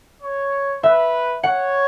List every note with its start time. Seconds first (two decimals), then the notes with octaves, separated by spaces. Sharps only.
0.22 C#5
0.82 B4 E5
1.43 C#5 F#5